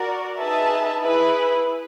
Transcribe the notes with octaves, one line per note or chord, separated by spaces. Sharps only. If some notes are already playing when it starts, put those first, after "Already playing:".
Already playing: F#4 A#4 D5
D#4 G#4 B4 E5 A5
E4 G#4 B4